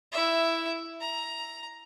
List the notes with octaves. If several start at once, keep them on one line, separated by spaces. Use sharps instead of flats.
E4 E5
A#5